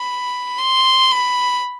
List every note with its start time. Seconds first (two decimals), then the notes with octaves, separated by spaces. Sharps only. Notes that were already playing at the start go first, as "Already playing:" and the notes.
Already playing: B5
0.58 C6
1.11 B5